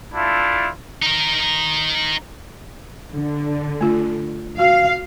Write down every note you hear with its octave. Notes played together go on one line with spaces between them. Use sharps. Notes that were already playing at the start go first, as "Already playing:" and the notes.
A3 D4 E4 F4
D#4 A#4
D3
A3 F4
F#4 F5